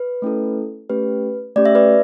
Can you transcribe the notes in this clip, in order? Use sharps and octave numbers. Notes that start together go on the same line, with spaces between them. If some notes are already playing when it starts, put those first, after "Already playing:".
Already playing: B4
A3 C#4 E4 A4
A3 C#4 G4 B4
A3 C#4 G4 D5
E5
B4 D5